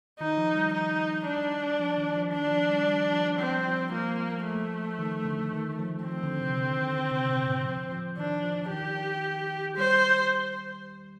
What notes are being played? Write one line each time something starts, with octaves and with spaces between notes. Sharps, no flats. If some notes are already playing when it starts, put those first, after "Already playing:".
D#3 D#4
F3
G3
D#4
D4
F3
D#3
F3
D#3 D4
F3
G3
G3
F3
F3 C4
G3
F3
F3 A#3
A3
D#3
D3
D#3
F3
F3 C4
D3
C3
D3
D#3
D3
C3
A#2
A2
F3
F3
D#3 D4
F3
D#3 G4
G3 C5